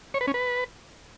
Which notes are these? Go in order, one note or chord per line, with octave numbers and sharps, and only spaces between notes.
C#5
B4
C#4
B4